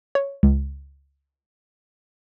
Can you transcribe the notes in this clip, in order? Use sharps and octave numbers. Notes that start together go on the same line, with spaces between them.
C#5
C#2